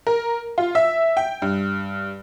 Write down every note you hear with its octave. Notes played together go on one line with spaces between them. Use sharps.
A#4
F4
E5
G5
G2